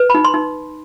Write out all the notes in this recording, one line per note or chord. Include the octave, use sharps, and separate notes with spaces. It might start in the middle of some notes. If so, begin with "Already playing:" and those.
Already playing: B4
B5
D#4
C6
D#4